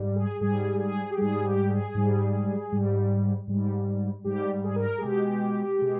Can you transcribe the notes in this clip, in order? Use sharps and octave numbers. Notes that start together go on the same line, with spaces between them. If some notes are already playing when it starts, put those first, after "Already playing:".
Already playing: G#2 G3
G#4
G#2 G3 G#4
G#4
G4
G#2 G3 G#4
G4
G#4
G#2 G3
G#2 G3
G#2 G3
G#2 G3 G4
G#4
A#4
G#4
B2 G#3 G4
B2 G#3